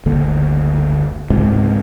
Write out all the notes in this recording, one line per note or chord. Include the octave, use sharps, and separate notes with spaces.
F#1 D2 D3 A#3
C#2 G#2 C3